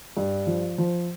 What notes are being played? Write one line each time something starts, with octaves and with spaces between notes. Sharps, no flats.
G2
F3
F3